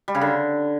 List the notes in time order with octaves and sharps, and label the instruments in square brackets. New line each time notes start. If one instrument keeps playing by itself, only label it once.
[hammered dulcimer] G3
C#3
D3